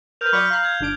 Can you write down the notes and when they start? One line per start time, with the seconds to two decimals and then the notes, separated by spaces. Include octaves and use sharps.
0.21 A#4 B4 F6 G6 F7
0.33 F#3 D5 B5 C#6 D#6
0.50 F5 A#5 F#6 C7
0.65 G#6
0.80 G1 D4 D7